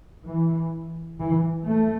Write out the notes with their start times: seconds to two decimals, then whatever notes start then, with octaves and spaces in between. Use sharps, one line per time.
0.27 E3
1.20 E3
1.67 A3